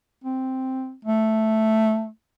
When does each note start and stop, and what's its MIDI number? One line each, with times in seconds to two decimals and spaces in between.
0.24 0.94 60
1.05 2.09 57